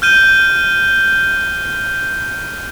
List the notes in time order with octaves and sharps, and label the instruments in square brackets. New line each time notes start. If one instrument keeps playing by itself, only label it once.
[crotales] F6 G6 D#7 G7